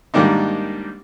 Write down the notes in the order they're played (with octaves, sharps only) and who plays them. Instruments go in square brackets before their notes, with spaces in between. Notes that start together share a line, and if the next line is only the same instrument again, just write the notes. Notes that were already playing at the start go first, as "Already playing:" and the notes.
[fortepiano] G#2 D#3 G3 A#3 D4 D#4